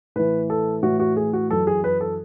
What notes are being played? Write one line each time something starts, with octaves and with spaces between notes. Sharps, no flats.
A2 E3 B4
A4
A2 E3 F#4
F#4
G#4
F#4
F#2 E3 A4
G#4
B4
A4